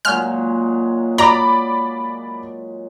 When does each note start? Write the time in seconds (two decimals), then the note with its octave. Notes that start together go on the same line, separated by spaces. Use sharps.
0.05 A#2 F#3 G#3 F6
1.18 D5 A#5 B5 D6